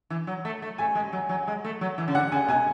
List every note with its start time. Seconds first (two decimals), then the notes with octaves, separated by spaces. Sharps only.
0.10 E3
0.27 F#3
0.45 A3
0.62 A3
0.78 A3 G#5
0.95 G#3
1.13 F#3
1.29 F#3
1.47 G#3
1.64 A3
1.81 F#3
1.98 E3
2.08 C#3
2.15 D3 F#5
2.32 C#3 G#5
2.48 B2 G#5